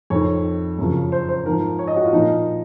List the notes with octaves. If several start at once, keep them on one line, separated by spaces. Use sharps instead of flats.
F2 D#3 C#5
F#2 C#3 F3
C5
C5
G#2 F3 A#4
C#5
D#5
F#4
F4
A#2 F3 D#4